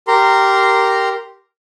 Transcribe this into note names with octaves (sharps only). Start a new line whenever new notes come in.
G4 A#4 A#5 C6